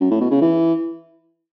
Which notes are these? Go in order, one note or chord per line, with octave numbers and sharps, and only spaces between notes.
F#2
A2
B2
C#3
E3